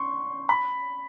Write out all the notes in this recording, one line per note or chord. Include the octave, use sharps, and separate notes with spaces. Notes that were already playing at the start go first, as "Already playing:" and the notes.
Already playing: C6 C#6
B5